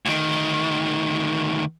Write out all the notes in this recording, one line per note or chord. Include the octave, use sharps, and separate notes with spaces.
D2 D#3